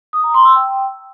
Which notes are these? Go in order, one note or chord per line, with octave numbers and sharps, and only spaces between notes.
D#6
A#5
C6
E6
G5